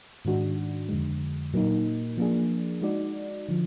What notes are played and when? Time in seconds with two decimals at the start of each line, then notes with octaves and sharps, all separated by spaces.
0.25 G#2 D#3 G#3 D4 F#4
0.89 F2 D3 G#3
1.54 A#2 F#3 A#3 D#4
2.17 F3 A#3 D4 G#4
2.82 G#3 D#4 F#4 D5
3.49 D3 F3